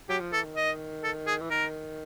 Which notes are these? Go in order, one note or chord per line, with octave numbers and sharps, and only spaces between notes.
F#3 G4
F3
E3 A4
D#3
D#5
A4
G#4
E3
D#3 A#4